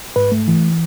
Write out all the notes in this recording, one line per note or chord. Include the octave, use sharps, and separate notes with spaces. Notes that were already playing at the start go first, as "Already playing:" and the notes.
G#2 B4
A3
E3